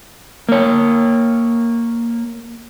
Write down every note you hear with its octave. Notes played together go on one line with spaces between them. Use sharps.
A#3 C#5